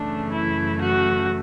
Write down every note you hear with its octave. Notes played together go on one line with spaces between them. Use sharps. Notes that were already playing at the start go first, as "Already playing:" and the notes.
Already playing: F#2 C#3 E3 A3 D4
E4
F#4